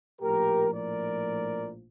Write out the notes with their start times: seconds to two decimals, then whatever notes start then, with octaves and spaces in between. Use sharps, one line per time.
0.21 A#1 A2 F3 G4 A#4
0.74 A#4 D5